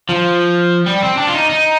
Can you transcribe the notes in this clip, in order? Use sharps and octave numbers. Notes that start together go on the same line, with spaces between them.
F3
G3
C4
D4
F4
D#4
D#4